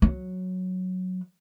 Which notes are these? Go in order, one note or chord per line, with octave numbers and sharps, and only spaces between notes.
F#3